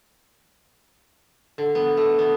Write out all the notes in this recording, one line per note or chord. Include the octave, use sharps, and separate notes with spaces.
D3
B3
A3
B3